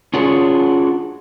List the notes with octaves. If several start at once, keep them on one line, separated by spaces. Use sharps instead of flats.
C#4 D4 F4 F#4 G#4 C#5